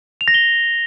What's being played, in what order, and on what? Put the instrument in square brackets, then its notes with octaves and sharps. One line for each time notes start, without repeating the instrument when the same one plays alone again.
[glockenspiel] F7
A#6
G7